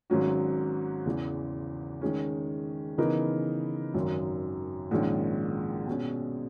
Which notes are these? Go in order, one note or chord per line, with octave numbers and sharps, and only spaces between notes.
G#1 G#2 F#3 C#4 F#4
E2 C#3 E3
D#3 G#3 C#4
C#3 E3 B3 D#4 A#4
G#1 F#2 D#3 F#3
A#1 G#2 D#3 G#3 C#4
B2 G#3 C#4